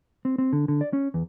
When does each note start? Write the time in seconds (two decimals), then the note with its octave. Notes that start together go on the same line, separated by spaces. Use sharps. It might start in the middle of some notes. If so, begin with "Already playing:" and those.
0.25 C4
0.38 C4
0.53 D3
0.68 D3
0.81 D5
0.93 C#4
1.14 E2